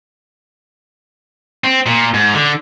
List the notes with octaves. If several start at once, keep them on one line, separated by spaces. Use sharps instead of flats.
C4
A#2
G#2
D3